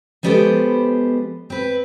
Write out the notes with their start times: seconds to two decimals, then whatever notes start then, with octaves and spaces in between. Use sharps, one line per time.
0.23 F3 G#3 B3 G4 A4 C5
1.50 C4 B4